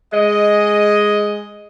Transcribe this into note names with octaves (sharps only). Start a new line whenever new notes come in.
G#3 D#5